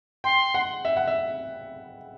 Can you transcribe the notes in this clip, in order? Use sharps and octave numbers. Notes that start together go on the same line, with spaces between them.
G5 C6
F#5
E5
F#5
E5